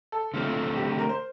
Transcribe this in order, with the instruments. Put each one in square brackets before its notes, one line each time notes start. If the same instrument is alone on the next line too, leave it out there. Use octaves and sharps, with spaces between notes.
[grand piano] A4
[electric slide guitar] D3 A3 C4 [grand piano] F4
[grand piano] G4
G4
A#4
C5